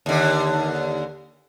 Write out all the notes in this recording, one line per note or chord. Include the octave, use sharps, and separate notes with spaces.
D#2 D3